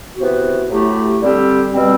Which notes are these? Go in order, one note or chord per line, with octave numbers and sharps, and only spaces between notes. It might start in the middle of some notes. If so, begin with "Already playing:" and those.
C3 E3 B3 F#4
A2 F#3 A3 E4 G4
D3 G3 C4 G4
B2 G3 C4